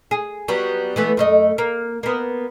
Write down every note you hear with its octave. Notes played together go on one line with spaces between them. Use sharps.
G#4
F#3 G3 B3
E3 A3 B3
F#2 A3 D#5
A#3
A#3 B3